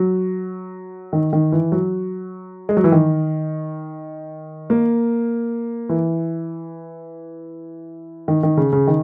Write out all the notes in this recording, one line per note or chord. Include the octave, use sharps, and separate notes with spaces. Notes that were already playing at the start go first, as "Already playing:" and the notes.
Already playing: F#3
D#3
D#3
E3
F#3
G#3
F#3
E3
D#3
A#3
E3
D#3
D#3
C#3
C#3
D#3